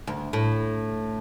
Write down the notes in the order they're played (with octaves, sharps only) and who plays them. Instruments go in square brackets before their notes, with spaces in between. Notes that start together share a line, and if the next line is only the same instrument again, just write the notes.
[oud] D2
A2